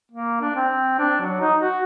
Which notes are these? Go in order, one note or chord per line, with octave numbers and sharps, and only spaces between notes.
A#3
D4
C4
D4
F#3
D#4
F#4